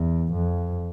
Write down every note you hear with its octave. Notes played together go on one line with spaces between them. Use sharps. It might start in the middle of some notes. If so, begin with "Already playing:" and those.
Already playing: E2
F2